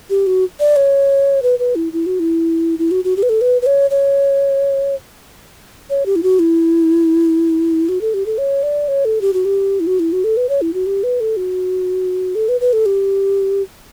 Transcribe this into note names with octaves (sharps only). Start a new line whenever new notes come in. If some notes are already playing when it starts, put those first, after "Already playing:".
G4
F#4
D5
C#5
B4
B4
E4
E4
F#4
E4
E4
F#4
F#4
G4
B4
A4
B4
B4
C#5
C#5
C#5
G4
E4
F#4
E4
F#4
A4
G4
A4
C#5
D5
C#5
A4
G4
F#4
G4
E4
F#4
E4
F#4
A4
B4
C#5
E4
F#4
G4
B4
A4
F#4
A4
B4
B4
A4
G4